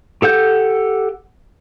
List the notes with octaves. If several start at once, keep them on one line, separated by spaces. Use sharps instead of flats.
G4 A4 F#5 G6